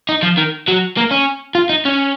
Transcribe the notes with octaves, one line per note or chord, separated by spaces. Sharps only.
D#4
F3
D#3
F#3
A#3
C#4
F4
D#4
C#4